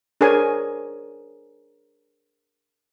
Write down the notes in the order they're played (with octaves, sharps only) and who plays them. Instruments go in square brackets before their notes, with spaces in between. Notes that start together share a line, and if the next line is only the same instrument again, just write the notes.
[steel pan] D4 G#4 A#4 C5 C#5 G#5